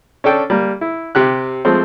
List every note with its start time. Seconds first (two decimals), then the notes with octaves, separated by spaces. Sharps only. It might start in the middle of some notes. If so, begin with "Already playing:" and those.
0.24 C#4 D4 A4 G5
0.50 G3 A#3
0.81 E4
1.15 C3 G4 F#6
1.65 F3 G#3 A3 C4 C5